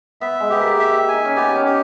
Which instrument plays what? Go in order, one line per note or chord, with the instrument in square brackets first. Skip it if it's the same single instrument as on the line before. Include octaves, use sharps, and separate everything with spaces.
[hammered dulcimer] B3 [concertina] E5
[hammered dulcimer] G#3
[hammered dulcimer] B3 [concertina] G4
[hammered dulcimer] A#3
[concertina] E5
G#5
[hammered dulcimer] D#4
C#4
[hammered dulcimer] B3 [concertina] G4
[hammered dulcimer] C#4
[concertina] G4